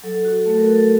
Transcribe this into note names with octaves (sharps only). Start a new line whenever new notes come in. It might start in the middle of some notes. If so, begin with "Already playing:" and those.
F#3 A4
F#4
A3 A4
A#4
F#4
A4